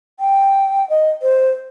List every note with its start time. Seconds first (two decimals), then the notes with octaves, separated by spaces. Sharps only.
0.20 G5
0.90 D#5
1.22 C5